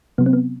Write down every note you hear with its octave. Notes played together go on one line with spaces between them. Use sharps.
C3 F#3 B3
C4
B3